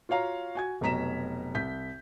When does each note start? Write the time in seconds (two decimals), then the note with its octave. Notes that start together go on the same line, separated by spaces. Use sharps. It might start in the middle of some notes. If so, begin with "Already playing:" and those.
0.09 F4 F#4 C#5 F5 A#5
0.55 F#4 G#5 G#6
0.81 F1 B2 F#3 A#5 B6 E7
1.55 C2 G6 B6